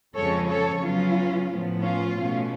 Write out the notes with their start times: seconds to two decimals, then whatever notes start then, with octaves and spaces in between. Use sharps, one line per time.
0.15 F2 C#3 F3 G#3 C#4 A4 C#5
0.48 A4 C#5
0.82 C#3 F#3 B3 C#4 F4
1.50 A2 F3 B3
1.82 C#4 F4
2.16 B2 A3 C#4